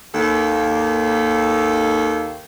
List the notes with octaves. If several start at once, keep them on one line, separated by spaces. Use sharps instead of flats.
D#2 A#3 A4